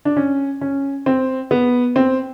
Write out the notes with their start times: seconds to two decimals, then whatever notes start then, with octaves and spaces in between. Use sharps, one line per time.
0.05 D4
0.17 C#4
0.61 C#4
1.06 C4
1.51 B3
1.96 C4